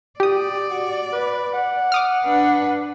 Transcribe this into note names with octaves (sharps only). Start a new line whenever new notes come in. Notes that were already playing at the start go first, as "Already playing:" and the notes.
G4 D5 D#6
F#4
B4
F#5
D6 D#6 F6
D4 B4